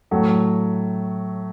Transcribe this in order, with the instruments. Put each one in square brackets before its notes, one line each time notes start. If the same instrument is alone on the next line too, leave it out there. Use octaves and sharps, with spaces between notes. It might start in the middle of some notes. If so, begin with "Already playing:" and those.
[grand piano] A2 F#3 A3